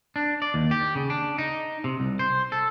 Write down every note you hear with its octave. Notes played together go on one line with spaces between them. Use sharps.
D4
D5
D#2
G4
C#3
D4
D#4
C3
C2
C5
A4